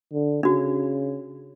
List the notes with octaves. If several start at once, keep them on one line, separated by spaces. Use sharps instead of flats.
D3
C#3 D4 F#4